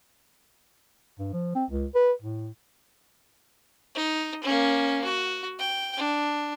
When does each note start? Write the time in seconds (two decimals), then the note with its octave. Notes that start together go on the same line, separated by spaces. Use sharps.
1.19 G2
1.33 F3
1.55 C4
1.71 C#2
1.95 B4
2.22 A2
3.95 D#4
4.44 A#3 C#4
5.04 F#4
5.59 G5
5.97 D4